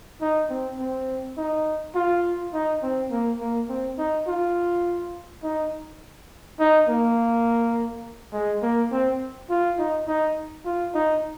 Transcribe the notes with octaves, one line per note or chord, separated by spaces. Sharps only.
D#4
C4
C4
D#4
F4
D#4
C4
A#3
A#3
C4
D#4
F4
D#4
D#4
A#3
G#3
A#3
C4
F4
D#4
D#4
F4
D#4